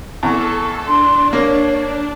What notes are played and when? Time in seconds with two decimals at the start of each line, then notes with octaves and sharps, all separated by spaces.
0.23 E2 A4 C#6
0.86 D4 C6
1.33 A#3 C#5